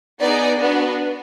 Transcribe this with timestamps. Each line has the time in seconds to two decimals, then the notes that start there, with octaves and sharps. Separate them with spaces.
0.21 B3 D#4 G#4 D5
0.60 B3 D4 F#4